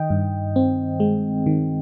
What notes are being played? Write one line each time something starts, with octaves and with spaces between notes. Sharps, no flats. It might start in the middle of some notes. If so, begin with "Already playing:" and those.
Already playing: D#3 D#5 G5
G2
C4
G#3
D#3